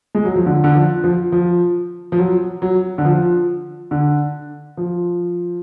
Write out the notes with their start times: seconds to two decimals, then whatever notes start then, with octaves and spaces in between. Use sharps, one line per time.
0.15 G#3
0.25 F#3
0.35 F3
0.46 D3
0.64 D3
0.75 F3
1.04 F3
1.32 F3
2.12 F3
2.19 F#3
2.62 F#3
2.98 D3
3.05 F3
3.91 D3
4.77 F3